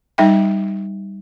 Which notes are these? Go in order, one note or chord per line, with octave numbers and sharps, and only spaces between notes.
G3 D#4 E5 G5